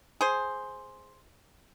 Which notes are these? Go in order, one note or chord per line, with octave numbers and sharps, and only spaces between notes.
G#4 C5